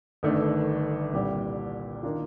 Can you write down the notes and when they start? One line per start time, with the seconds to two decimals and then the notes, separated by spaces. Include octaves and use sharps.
0.23 G1 G2 D#3 A3 D4
1.13 C2 A#2 G3 D4 G4
2.03 D#3 A#3 D4 F4